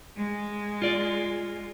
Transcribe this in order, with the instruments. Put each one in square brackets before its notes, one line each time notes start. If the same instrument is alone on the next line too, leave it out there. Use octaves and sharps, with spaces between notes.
[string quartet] G#3
[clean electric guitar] F4 D5